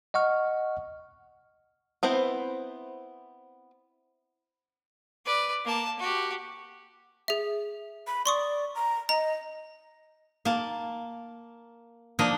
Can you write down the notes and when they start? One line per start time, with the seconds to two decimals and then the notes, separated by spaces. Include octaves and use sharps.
0.14 D#5 F#5 C#6 F6
2.03 B3 C4 E4 C5
5.26 B4 D5
5.65 A#3 A5
5.99 F#4 G4
7.28 G#4 E5
8.07 B5
8.26 D5 C6 C#6 D#6
8.75 A#5
9.09 D#5 A#5
10.45 A#3 A5
12.19 F3 A#3 D4 D#5